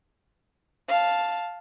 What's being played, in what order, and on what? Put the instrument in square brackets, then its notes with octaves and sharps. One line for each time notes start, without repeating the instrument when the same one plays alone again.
[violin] F5 A5